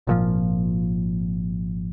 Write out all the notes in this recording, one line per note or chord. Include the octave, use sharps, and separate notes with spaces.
G#1 A#2 F3